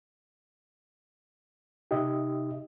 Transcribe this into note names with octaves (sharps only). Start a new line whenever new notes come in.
C3 D#4 G4 D#5 E5